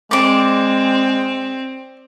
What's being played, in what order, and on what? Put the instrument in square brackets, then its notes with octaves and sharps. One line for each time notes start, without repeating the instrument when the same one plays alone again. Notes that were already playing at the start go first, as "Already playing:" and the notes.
[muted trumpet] G#3 [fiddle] C4 [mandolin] D5 D6